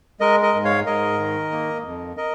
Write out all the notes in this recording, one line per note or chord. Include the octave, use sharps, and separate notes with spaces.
G#3 A#4 D#5
A#4 D#5
G#2
C#5 F5
G#2 A#4 D#5
D#3
A#3
F2
A#4 D#5